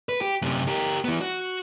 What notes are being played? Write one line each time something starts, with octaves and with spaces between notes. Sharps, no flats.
B4
G4
F#2 C3
G4 A#4
E3 B3
F#4